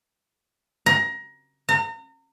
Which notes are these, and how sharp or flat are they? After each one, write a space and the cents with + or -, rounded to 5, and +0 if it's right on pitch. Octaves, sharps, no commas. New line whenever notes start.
A#5 +20
A#5 -35